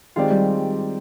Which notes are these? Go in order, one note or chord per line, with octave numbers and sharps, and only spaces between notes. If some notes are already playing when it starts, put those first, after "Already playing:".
D#3 G#3 C4 F4 G4 D5
G3